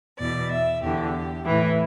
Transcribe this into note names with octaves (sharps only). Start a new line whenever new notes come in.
E2 B2 D5
E5
E2 D3 G4
A2 E3 E4